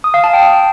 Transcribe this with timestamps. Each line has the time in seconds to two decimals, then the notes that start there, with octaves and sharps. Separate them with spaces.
0.04 D#6
0.14 F5
0.24 A5
0.33 G5